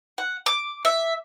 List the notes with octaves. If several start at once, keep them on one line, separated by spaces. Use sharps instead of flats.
F#5
D6
E5